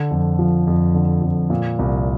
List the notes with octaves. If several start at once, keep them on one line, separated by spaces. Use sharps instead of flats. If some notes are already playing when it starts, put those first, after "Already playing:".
Already playing: D3
F2
F3
F2
D3
F2
A#2
C2